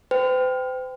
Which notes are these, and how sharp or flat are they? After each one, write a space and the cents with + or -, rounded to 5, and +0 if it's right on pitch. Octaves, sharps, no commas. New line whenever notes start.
C5 -45 G5 +0